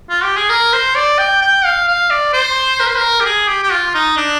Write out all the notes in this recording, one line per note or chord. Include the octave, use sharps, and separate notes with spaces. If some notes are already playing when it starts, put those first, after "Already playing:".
F4
G4
G#4
A#4
C5
D5
G5
G5
F5
F5
D5
C5
A#4
C5
A#4
G4
G#4
G4
G4
F4
D#4
D4